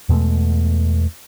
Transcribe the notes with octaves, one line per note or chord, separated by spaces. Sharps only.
E2 B2 G#3 A3